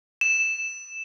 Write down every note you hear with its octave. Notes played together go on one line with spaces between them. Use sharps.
E7